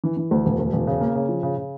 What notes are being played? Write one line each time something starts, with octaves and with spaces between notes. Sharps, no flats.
E3
E3
D2
E1
D2
E1
C#3
A#3
C#3
F3
C#3
C#3